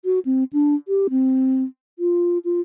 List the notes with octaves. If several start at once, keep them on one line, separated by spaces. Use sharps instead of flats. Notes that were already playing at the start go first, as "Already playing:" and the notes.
F#4
C4
D4
G4
C4
F4
F4